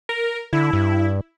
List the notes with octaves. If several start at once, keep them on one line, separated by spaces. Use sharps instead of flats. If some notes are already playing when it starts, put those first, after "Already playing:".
A#4
D3 E4
G2